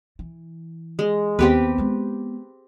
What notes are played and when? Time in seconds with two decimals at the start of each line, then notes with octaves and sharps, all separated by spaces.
0.19 E3
0.99 G#3
1.39 D#2 B3 C4 G4 B4
1.78 G#3 B3